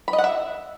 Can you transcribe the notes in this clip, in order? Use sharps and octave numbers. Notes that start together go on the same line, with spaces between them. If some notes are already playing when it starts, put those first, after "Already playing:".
B5
D#5
F#5
E5